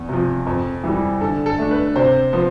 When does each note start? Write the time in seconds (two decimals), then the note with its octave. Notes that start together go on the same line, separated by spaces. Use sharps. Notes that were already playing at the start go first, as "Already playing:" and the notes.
Already playing: E2
0.09 C3 F3
0.46 F2
0.84 E3 G3
1.21 D3 A4
1.46 A4
1.58 A3 D4
1.71 B4
1.96 C3 C5
2.33 F3 B3